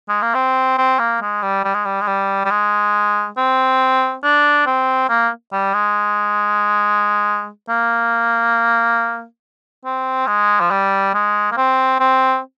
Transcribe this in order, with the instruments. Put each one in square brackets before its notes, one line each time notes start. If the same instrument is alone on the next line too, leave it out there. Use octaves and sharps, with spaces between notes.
[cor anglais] G#3
A#3
C4
C4
A#3
G#3
G3
G3
G#3
G3
G#3
G3
G3
G#3
C4
D4
C4
A#3
G3
G#3
A#3
C4
G#3
F3
G3
G#3
A#3
C4
C4